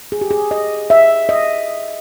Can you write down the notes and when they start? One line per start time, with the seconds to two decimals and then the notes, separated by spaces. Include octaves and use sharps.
0.12 G#4
0.21 G4
0.31 G#4
0.51 D#5
0.90 E5
1.29 D#5